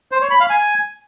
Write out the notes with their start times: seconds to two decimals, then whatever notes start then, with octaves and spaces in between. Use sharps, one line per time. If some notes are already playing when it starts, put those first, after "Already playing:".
0.12 C5
0.21 C#5
0.31 B5
0.40 F5
0.50 G#5